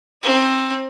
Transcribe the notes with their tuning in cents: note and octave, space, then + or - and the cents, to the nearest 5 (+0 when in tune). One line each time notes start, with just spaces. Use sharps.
C4 +15 D#4 +15